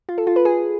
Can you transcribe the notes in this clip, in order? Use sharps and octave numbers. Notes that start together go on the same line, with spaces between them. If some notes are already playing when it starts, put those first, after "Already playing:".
F4
A4
F4
B4
G#4